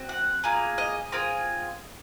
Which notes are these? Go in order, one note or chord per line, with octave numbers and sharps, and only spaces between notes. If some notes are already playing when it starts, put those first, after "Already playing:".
Already playing: C4 F#4
F#5
A#3 F4 G#4
D#5
C4 F4 G#4 A#4